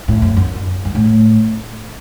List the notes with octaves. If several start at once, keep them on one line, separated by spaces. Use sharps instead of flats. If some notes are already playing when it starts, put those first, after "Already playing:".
A2
F#2
F#2
G2
A2